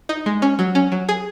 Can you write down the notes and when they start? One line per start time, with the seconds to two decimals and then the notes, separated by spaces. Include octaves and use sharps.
0.09 D#4
0.26 G#3
0.42 C#4
0.59 F#3
0.75 C#4
0.92 F#3
1.09 G#4